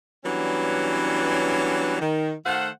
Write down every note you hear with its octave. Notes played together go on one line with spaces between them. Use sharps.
E3 F#3 G3 B3 C#4 D4
D#3
D#3 A3 C5 F5 F#5